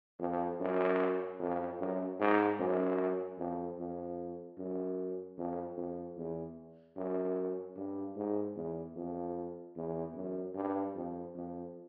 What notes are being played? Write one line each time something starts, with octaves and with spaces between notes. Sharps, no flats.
F2
F#2
F2
F#2
G#2
F#2
F2
F2
F#2
F2
F2
E2
F#2
G2
G#2
E2
F2
E2
F#2
G2
F2
F2